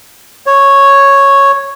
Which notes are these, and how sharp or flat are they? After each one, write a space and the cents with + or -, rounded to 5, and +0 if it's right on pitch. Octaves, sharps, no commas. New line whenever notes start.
C#5 -5